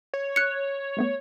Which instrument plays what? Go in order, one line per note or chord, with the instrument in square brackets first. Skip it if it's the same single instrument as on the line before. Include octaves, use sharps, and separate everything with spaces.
[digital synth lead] C#5
[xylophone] F#6 C#7
[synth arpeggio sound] G3 A3 B3